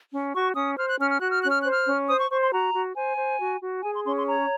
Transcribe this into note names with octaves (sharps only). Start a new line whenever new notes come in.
C#4
F#4 C#6
C#4 D#6
C5 F6
F#6
C#4 F6
F6
F#4 F#6
F6
C#4 F#6
F6
C5 F#6
F6
C#4
C5 D#6
C#6
C5 C#6
C6
F#4 A#5
F#4
C5 G#5
C5
F#4
F#4
G#4 G#5
C6
C#4 C6
C6
C#5 A#5